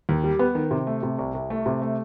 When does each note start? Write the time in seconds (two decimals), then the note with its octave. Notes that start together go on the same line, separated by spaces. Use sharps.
0.09 D#2
0.24 G3
0.39 B3
0.55 D#3
0.71 C3
0.87 A3
1.03 C3
1.19 C2
1.34 C2
1.50 A3
1.66 C3
1.82 A3